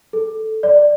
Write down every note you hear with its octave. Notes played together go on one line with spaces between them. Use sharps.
A4
D5